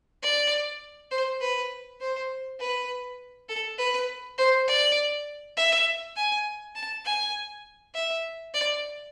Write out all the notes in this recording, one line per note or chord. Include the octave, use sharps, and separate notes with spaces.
D5
C5
B4
C5
B4
A4
B4
C5
D5
E5
G#5
A5
G#5
E5
D5